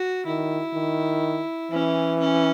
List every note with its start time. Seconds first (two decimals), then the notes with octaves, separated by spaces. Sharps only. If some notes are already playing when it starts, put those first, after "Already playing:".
Already playing: F#4
0.26 D#3 E4
0.74 D#3
1.72 E3 C#4
2.20 C#4